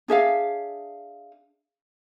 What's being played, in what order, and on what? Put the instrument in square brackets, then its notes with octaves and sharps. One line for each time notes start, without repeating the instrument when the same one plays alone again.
[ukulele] D4 G#4 E5 F5